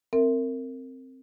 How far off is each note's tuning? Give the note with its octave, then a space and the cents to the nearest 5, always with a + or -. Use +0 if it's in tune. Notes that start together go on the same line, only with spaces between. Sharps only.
C4 +0 A#4 -25 E5 +0